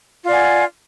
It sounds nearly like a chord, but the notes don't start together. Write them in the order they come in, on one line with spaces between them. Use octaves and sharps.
F4 D5 F#5 G#5